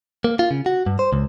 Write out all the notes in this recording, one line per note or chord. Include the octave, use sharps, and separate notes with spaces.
A#3
F4
C#3
F#4
G2
C5
C#2